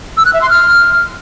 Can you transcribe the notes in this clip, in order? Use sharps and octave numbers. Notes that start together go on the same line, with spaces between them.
E6
F#6
E5
C6
F6